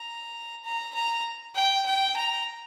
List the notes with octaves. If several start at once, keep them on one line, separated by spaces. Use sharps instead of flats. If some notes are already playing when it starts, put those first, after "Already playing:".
Already playing: A#5
A#5
A#5
G5
G5
A#5